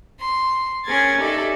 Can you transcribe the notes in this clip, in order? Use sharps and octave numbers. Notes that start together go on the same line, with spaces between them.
C6
C#4 G#4 A#4 G#6 A6
D#4 G4 A4 D5 E5 B5